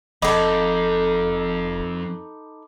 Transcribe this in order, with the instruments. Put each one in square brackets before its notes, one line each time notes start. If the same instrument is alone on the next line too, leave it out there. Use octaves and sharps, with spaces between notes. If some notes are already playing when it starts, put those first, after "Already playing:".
[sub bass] F1 [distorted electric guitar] F2 [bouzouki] D#4 A4 [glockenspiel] B5 D6 D#6